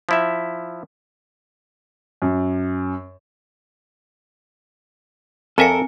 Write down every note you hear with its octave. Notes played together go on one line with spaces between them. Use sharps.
F3 E4 E5
F#2
F2 C4 A4 A#4 D#5 E5 G#5 C#7